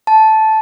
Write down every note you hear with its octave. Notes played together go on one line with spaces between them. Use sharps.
A5